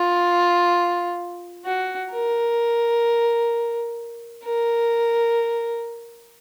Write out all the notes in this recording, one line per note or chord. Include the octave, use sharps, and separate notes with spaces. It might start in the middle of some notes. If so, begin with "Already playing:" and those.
Already playing: F4
F#4
A#4
A#4